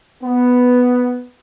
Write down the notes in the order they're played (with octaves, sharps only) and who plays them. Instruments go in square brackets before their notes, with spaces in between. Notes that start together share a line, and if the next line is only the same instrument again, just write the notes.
[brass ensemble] B3